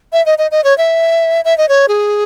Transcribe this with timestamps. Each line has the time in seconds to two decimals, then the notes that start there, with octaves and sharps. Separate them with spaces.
0.13 E5
0.26 D#5
0.38 D#5
0.51 D#5
0.64 C#5
0.78 E5
1.45 E5
1.58 D#5
1.69 C#5
1.88 G#4